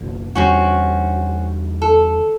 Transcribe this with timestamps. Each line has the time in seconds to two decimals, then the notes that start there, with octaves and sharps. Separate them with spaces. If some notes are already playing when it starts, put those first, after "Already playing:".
0.01 F#1 B1
0.35 E2 D3 G3 C4 C#4 F#4
1.82 A4